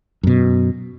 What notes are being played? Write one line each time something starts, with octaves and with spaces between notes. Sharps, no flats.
F#2 B2